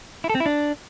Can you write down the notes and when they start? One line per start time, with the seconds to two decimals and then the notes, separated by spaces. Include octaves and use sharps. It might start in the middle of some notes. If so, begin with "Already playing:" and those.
0.24 E4
0.30 A4
0.35 C4
0.40 E4
0.46 D4